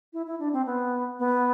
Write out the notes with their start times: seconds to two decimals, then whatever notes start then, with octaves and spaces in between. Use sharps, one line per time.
0.13 E4
0.26 E4
0.39 D4
0.53 C4
0.66 B3
1.19 B3